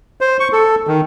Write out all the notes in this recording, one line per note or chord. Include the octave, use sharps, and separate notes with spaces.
C5
C#6
A4
D#3